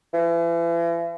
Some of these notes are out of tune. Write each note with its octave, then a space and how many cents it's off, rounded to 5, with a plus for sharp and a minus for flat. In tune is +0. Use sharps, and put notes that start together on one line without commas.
E3 +40